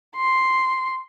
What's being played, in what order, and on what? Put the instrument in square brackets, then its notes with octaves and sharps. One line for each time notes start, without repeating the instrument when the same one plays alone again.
[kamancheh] C6